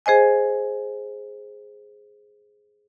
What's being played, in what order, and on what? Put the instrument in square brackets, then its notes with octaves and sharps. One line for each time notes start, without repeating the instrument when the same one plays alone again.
[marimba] G#4 C5 D#5 G#5